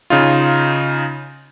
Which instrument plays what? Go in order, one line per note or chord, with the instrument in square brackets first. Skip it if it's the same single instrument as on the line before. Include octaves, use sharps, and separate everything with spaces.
[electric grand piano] C#3 D#4 F4